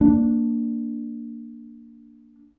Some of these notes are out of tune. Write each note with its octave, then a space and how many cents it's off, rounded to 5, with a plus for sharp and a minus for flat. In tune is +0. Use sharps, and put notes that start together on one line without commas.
A#3 -5 D4 +0